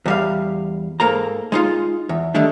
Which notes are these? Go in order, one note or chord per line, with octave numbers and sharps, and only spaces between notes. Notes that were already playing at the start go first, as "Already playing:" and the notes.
E2 G3 F5
G#2 A#3 A4 A#5
G#3 D#4 F4
E2
D3 D#3 G3 A3 D4